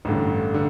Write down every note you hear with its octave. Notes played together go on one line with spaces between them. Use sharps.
A1 G2 D3
D3